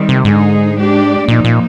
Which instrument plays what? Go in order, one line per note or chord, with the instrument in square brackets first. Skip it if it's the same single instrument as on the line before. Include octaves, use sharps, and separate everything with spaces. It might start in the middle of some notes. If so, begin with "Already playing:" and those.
Already playing: [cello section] D#3 G3 C4
[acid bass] C3
[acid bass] G#2 [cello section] D3 G#3 D#4 G#4
[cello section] G#3 D4 G4 D5
[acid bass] A#2 [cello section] F3 A#3 D#4
[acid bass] A#2